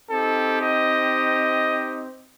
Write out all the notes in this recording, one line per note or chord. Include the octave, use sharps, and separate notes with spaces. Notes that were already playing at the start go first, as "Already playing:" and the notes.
C4 D#4 G4 A4
D#5